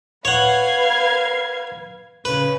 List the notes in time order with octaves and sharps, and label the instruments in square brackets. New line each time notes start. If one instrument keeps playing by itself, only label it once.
[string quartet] B4 F5 G#6 [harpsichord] C#5 F#5
[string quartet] C#3 [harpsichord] B4